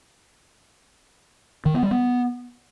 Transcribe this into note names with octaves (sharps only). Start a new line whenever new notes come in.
D#3
B3
G3
B3